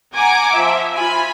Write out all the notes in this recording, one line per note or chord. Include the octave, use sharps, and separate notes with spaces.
F#5 G#5 A#5 D6
F3 E5
F4 G#5 B5